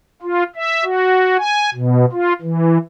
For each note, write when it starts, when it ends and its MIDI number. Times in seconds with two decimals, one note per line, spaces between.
0.22 0.43 65
0.56 0.84 76
0.84 1.37 66
1.39 1.70 80
1.74 2.06 47
2.12 2.33 65
2.42 2.78 52